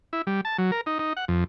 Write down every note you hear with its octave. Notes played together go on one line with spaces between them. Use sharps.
E4
G3
A5
F#3
A#4
D#4
D#4
F#5
F2